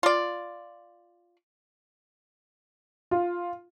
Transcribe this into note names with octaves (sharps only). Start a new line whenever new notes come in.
F4 D5
F4